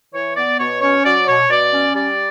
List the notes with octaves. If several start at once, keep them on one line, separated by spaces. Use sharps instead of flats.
E3 C#5
B3 D5
B2 C#5
C#4 C#5
F#3 D5
B2 C#5
B2 D5
C#4
G3 D5